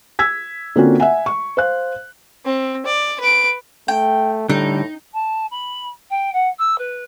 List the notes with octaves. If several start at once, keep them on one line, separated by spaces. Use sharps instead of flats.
E6 G#6 B6
D3 A#3 C4 C#4 F4 F#4
E5 F#5 G#5
C#6
C5 F5 F#6
C4
D5
B4 D7
A3 G5
A2 D3 G3 D#4
A5
B5
G5
F#5
E6
B4